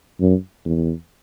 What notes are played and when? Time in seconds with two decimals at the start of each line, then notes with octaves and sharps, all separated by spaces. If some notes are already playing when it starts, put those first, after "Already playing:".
0.21 F#2
0.65 E2